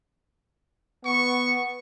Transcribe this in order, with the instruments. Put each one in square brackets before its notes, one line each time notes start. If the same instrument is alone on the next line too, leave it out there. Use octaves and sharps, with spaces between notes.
[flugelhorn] B3 [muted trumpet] C#6